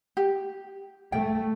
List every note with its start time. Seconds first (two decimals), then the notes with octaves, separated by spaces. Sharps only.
0.17 G4
1.12 A3 G5